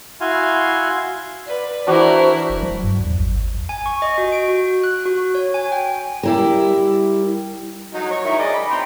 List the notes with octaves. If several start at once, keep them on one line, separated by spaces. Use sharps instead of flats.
E4 F#4 F5 G#5 C6
B4 D5
E3 D4 E4 F#4 A#4 C5
F1
F#3
G2
E2
G#1
G#5
C#6
D#5
F#4
D7
F#4
F#6
F#4
C#5
G#5
G5
G3 E4 A#4
F#3 D#4
C#5 C#6
D#3 E4 A#4
G#4 D5 D#5
B5
G5 A#5 C6